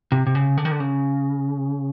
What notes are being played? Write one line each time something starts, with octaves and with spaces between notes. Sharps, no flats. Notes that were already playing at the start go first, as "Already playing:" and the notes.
C3
C3
C#3
D3
D#3
D3
C#3